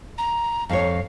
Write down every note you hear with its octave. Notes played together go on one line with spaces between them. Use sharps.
A#5
F2 C#5 F5